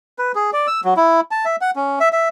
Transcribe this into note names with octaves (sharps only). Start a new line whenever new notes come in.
B4
G#4
D5
E6
F#3
E4
A5
E5
F#5
C#4
E5
E5